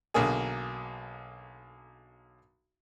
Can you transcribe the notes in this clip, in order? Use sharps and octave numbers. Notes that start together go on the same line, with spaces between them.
B1 D3 A#3 G#4